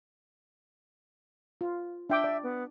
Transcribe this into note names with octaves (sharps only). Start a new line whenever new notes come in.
F4
D4 E5 G5 D6
D5
B3